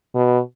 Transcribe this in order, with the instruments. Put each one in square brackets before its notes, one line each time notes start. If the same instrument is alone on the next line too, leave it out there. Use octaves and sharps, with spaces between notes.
[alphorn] B2